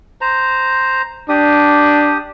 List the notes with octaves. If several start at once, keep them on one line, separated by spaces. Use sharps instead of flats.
C5 A#5
D4 G4 D#6